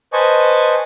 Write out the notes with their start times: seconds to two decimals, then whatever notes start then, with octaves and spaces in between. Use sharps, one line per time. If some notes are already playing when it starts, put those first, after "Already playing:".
0.13 B4 C5 D#5 G#5 A5 C#6